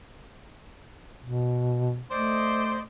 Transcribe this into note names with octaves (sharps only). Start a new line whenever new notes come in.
B2
A3 C5 D5 D#5